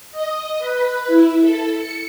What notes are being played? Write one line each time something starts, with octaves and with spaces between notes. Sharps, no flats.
D#5
B4
E4
A4
C#7